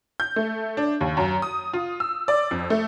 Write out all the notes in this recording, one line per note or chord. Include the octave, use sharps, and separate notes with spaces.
G6
A3
D4
D#2
F#2
D#6
F4
E6
D5
F2
A3